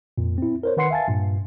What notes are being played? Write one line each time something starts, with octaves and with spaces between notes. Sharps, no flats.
F2 A#2
C4 E4
A#4 C5 C#5
D#3 B4 F#5 C6 C7 C#7
E5 F5 G#5 A5 A6
G2 A#2